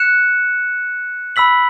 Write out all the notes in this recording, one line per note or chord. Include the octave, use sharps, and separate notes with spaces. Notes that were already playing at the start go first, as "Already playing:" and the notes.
Already playing: F#6 C#7 E7
B5 E6 B6 F#7